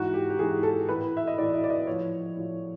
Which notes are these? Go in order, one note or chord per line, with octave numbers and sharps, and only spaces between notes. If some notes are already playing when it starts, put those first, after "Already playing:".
Already playing: G#2 E3 F#4
G4
G4
G#2 E3 G#4
A4
A2 E3 B4
E5
D#5
A2 E3 D5
D#5
D5
D#5
A2 F3 C#5
A2 F3